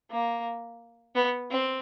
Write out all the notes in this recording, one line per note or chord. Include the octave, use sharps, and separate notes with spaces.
A#3
B3
C4